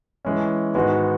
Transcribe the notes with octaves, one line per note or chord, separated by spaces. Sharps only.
E3 G#3 C#4
G#2 D#3 G#3 B3 F#4